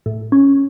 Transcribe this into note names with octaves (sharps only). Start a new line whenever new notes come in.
A2
C#4